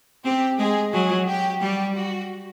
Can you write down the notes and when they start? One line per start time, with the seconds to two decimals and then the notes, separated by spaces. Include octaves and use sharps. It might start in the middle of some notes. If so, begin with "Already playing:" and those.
0.25 C4 G4
0.59 G#3 G#4
0.93 F#3 G#4
1.28 G4
1.62 G3 G4
1.96 F#4